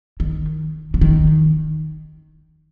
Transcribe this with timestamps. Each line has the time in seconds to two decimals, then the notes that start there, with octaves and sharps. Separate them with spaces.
0.20 D#3
0.94 D3
1.01 D#3